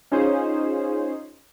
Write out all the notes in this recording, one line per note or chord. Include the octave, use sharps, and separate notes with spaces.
C#4 D#4 F4 G#4 C5